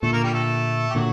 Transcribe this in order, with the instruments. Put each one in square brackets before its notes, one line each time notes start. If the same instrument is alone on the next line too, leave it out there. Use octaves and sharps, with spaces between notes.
[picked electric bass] A#2 D3 [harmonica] A3 A4
[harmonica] A#3 A#4
G3 G4
A3 A4
G4
[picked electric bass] A#2 D3 [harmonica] F#3 F#4